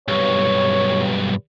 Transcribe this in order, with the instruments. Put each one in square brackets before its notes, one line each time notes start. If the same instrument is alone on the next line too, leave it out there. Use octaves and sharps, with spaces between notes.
[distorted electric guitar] B1 G2 [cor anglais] C#5